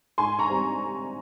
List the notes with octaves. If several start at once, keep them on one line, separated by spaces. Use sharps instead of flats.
G#2 G#5 C6
A#5 C#6
G3 C4